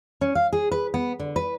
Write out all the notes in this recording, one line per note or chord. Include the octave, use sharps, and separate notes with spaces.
C#4
F5
G#4
B4
B3
D3
B4